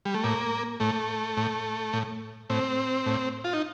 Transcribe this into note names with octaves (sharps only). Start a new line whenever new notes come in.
G3
A3
A2 A#3
A2 A3
A2
A2
A2 C4
A2
F4
D#4